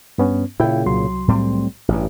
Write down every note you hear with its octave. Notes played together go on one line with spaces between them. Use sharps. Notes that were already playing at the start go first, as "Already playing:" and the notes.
G2 B3 C#4
A#2 C#3 E4 G5
C2 F#3 C6
A2 G3 C4
A1 G2